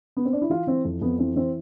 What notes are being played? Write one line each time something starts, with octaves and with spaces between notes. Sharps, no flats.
B3
C4
D4
E4
E3 F4
E3 C4
F2
F2 B3
E3 C4
E3 C4